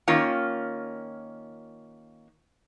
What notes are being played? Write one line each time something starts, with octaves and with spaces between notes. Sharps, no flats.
D#3 A#3 C#4 F4